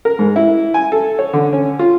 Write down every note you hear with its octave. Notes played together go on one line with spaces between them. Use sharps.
A#4
G#2
E4
G#5
A4
C#5
D3
C#4
F4